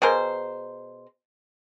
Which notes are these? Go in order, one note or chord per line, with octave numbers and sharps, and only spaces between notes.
B2 G#4 A#4 C5